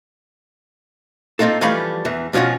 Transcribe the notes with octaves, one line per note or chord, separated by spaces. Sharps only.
A#3 C4 D#4 F4 A4
E3 F3 G3 A3 F5 B5
E2 E3
B2 F3 C#4 F4 F#4